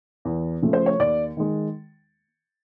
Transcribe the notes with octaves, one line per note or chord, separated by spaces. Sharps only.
E2
C#3 F3 A3
C5
C#5
D#2 D5
D#3 G#3